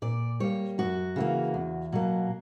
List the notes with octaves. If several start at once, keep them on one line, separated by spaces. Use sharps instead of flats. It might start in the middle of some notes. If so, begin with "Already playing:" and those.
A#2 D5
G3 A#3 C#5
F#2 F#4
C#3 E3 A#3
E2
B2 F#3 A#3